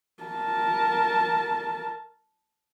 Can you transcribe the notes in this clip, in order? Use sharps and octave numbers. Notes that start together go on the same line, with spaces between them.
A#4 A5